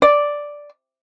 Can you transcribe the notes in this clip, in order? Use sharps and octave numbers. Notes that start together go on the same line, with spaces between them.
D5